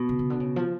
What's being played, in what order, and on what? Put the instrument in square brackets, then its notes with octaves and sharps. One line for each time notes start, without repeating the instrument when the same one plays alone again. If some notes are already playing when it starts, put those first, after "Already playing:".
Already playing: [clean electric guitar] B2
[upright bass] C#3
C#3
D3
C#3
F3